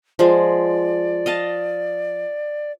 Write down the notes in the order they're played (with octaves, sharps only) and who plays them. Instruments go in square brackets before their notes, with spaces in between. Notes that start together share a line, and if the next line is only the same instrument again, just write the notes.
[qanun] F3 G#3 [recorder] D5
[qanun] D#5 F5 A5